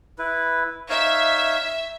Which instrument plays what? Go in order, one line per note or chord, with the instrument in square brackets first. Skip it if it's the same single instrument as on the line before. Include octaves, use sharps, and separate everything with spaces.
[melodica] E4 B4
[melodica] D#4 C#5 F5 [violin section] E5